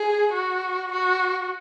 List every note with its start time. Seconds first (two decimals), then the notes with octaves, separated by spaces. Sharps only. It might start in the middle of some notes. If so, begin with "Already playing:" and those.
Already playing: G#4
0.33 F#4
0.92 F#4